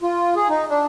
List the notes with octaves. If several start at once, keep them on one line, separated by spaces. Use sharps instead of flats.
F4
G#4
D#4
D4